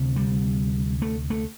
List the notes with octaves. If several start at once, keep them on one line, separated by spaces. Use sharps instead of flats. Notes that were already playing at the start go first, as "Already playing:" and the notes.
Already playing: D2 C3
G3
A3
A3